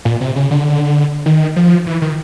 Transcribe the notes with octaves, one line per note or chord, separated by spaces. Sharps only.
A#2
C3
C#3
D3
D#3
F3
E3
D#3